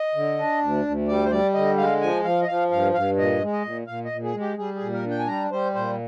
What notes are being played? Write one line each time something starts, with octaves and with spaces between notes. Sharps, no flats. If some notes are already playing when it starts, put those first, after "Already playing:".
Already playing: D#5
D3
D4
D2
D2
G3 D5
C5
G3 D5
D3 D#5
G#3 F5
F3 G#5
F3 F5
D#5
F3 F5
G2 F5
G2 F5
A#2 D#5
G#3
D#5
A#2
A#2 F5
D#5
A#2
G#4
G#3
G4
G3 G#4
G#4
A#2
A#4
D4
G5
G#5
G3 A#5
G3 C5
A#2 C5